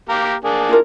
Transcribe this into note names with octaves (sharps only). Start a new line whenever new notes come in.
A#3 G4 A#4
A#3 D4 G#4
E4 F4 A#4